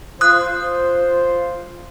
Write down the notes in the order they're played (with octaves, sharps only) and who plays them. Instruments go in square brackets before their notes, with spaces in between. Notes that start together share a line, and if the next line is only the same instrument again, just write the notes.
[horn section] F4 C5 [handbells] D#6 F#6